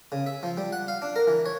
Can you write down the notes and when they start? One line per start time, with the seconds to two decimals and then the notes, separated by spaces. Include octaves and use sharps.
0.12 C#3
0.26 E5
0.43 F3
0.57 G3
0.73 F#5
0.88 F5
1.02 D4
1.16 A#4
1.27 E3
1.46 C#5